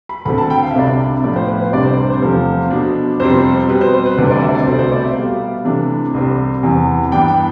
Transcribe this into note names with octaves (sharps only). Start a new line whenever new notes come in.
B5
D2 D3 A3 C4 B5
A5
G5
F5
E5
C2 C3 G3 D4 D5
E5
A2 F3 B3 D5
C5
B4
C5
C2 C3 G3 D4 D5
C5
C5
C5
E2 C3 F3 A3
B2 B3 D4
F2 C3 G3 C4 C5
B2 G3 C4 B4
C5
C5
B4
D2 C3 G3 D4 C5
D5
E5
D5
C2 B2 A3 C4 C5
D5
C5
D5
E5
B2 G3 B3 F5
C3 E3 A3 D4
C2 C3 G3 C4
E2 C3 E3
G2 E3 B3 D4 G5
G5